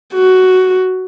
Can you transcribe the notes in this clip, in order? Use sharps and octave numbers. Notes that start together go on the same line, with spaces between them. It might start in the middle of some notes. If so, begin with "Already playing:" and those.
F#4